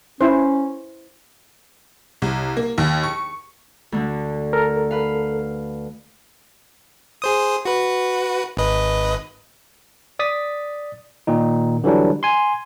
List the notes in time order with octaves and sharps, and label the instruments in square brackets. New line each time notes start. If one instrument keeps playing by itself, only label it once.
[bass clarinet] C#4 [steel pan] E4 C5
[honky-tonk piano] C2
A#3
D#2
C#6
[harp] D2 D3 A3
[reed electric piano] A4 A#4
[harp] B4 F5
[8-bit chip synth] G#4 C5 D#6
F#4 B4
G#1 B4 D#5
[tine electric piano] D5 D#6 A6 B6
A#2 D#3 D#4
D3 E3 F#3 G3 D4
G#5 C6